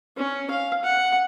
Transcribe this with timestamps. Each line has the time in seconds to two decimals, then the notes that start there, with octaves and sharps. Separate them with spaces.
0.17 C#4
0.51 F5
0.84 F#5